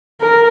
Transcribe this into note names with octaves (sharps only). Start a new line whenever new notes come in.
A#4